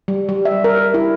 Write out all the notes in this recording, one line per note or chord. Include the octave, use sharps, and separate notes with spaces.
G3
G3
E5
A#4
E4